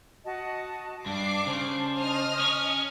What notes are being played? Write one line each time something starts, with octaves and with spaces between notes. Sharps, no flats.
F#4 D#5 A5
G2 D4 D6 C7
C#3 D4 C5 A5
D#5 D#6 F6
C#4